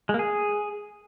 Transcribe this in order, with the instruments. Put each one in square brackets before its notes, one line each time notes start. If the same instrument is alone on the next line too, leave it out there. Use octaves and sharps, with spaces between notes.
[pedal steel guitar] G#3
A#3
G#4